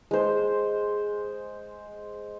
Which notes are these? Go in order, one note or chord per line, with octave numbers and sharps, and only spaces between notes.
G#3 C5